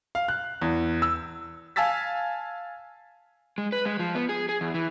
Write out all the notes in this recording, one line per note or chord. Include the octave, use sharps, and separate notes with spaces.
F5
F#6
E2
E6
F5 G#5 A5 E6 A6 B6
G#3
B4
G#3
F3
B3
G#4
G#4
E2
E3